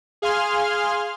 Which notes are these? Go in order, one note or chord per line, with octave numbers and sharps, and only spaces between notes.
G#4 F5 G#5 C6 F6